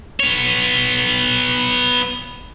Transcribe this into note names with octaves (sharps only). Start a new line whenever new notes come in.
B3 C#5